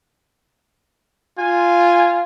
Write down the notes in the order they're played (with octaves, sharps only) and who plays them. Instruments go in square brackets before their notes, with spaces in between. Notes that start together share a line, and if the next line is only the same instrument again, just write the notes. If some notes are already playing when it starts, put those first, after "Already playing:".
[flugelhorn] F4 [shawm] G#5